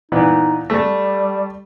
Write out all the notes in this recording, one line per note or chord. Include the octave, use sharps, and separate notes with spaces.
A#2 E3 B3 D#4
G3 A3 A4